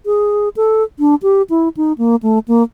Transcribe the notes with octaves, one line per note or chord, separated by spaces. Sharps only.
G#4
A4
D4
G4
E4
D#4
A#3
A3
A#3